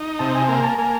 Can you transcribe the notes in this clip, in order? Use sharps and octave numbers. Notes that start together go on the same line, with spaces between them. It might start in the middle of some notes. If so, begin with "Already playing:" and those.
Already playing: D#4
C3 A5
G#5
A#3 G#5
A5
A#3 G#5